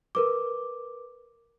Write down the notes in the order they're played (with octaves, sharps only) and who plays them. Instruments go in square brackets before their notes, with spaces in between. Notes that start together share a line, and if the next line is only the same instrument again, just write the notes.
[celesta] A#4 B4 D6